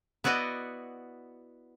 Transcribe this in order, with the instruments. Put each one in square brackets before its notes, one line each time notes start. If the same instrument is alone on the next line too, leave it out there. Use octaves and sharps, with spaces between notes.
[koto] B3 E4 F#4 D5 D#5